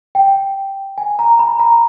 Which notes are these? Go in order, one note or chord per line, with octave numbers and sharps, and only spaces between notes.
G5
G#5
A#5
B5
A#5